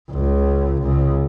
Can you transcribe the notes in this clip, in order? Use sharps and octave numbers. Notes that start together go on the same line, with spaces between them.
C#2
C#2 C#3